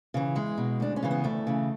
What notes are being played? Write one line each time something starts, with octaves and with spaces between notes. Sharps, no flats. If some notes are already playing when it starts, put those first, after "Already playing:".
C#3 E3
E2 G#3
B2
D2 D4
C#4
C#3 E3
B3
D2 A3
C#3 E3